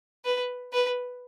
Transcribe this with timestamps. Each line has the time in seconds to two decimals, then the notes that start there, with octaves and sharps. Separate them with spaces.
0.25 B4
0.73 B4